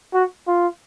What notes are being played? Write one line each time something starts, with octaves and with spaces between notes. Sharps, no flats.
F#4
F4